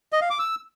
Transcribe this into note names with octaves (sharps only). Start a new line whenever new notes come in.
D#5
F5
D6
E6